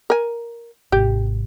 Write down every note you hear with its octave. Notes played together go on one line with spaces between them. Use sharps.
A#4 G#5
G#1 C3 G4